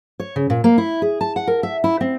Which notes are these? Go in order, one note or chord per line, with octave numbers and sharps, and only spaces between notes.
C#5
C#3
A#2
A#3
E4
G#4
A5
F#5
A#4
E5
E4
C4